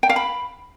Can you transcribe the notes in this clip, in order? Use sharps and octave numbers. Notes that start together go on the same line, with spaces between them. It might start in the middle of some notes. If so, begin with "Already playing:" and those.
G5
F5
B5